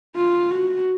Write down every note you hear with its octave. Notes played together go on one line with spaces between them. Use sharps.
F4
F#4